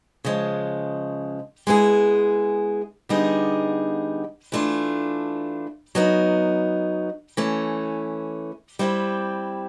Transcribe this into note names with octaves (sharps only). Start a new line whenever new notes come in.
C#3 F3 G#3
G#3 B3 E4 G#4
D3 G3 B3 D#4 G#4
E3 A3 D4 F4
F#3 B3 D#4
E3 A3 C#4
G3 C4 E4 G4